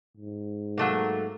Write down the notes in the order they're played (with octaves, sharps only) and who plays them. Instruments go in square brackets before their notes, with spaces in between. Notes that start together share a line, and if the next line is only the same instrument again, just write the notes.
[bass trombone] G#2
[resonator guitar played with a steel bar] F#3 A3 A#3